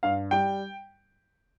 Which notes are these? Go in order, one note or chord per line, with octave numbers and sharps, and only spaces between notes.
G2 F5
G3 G5